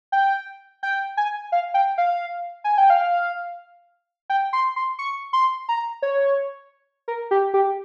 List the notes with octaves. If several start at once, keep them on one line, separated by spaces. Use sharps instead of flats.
G5
G5
G#5
F5
G5
F5
G#5
G5
F5
G5
C6
C6
C#6
C6
A#5
C#5
A#4
G4
G4